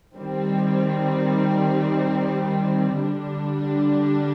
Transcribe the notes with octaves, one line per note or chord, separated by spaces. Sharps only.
D#3 G3 C4
D3 G3 D4